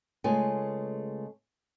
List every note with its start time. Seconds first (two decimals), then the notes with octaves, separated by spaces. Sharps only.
0.24 C#3 G#3 A3 F4 B4 G#5